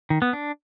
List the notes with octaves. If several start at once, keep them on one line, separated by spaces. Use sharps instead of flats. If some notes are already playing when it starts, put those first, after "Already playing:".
D#3
B3
D4